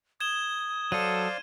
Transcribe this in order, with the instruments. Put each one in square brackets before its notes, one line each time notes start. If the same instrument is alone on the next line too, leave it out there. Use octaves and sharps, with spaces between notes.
[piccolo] D#6 [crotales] G#6 E7 G7
[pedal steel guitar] F#3 A4 [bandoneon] C5 D5 F5 [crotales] D#7